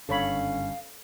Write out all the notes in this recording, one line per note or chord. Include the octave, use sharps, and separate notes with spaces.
F#1 G2 D3 C#4 A4 C#5 F5 B5